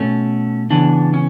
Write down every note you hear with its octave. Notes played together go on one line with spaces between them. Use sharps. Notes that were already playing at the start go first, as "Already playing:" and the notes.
Already playing: B2 A3 C#4
C#3 E3 B3 D4
C#4